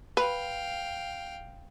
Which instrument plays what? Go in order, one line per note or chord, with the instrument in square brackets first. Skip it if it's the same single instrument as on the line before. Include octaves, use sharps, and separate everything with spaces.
[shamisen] B4 [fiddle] F5 G5